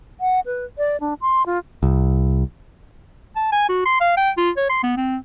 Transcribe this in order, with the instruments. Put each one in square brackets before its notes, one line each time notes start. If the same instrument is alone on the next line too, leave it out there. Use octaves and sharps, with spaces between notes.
[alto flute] F#5
B4
D5
D4
C6
F4
[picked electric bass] C2
[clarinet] A5
G#5
F#4
C6
F5
G5
F4
C#5
C6
B3
C4